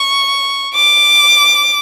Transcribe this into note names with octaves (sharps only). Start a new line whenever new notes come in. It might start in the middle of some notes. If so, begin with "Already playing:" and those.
Already playing: C#6
D6